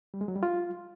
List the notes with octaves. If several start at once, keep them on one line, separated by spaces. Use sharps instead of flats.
G3
G#3
F#3
G3
F4